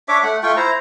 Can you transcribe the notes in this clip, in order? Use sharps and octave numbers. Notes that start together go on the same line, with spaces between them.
D4 C#5 E5 D6
A3 F#5
A3 F4 G5 C#6
E4 C5 A#5